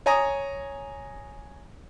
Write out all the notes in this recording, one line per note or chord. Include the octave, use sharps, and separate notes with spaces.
C#5 G#5 A#5 D#6